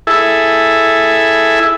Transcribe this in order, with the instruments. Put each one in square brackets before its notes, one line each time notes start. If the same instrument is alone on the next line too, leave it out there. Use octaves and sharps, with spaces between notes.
[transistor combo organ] E4 G#4 A4 E5